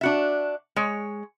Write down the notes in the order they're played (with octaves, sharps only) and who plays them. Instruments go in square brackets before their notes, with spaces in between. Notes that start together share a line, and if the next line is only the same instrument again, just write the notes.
[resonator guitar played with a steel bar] D4 F#4 E5
G#3 C#5